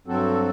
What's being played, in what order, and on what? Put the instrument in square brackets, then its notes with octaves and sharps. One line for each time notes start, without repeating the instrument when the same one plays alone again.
[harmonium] G2 F#3 C4 F#4 A4